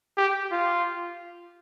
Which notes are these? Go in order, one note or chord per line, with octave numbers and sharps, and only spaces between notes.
G4
F4